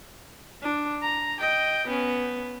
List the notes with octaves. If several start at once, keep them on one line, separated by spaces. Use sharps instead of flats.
D4
A#5
D#5 G5
B3 C#4